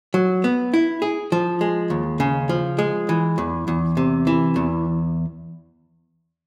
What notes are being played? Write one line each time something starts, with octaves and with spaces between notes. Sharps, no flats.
F#3
B3
E4
G#4
F3
G#3
D#2
C#3
F3
G#3
E3
E2
E2
C3
E3
E2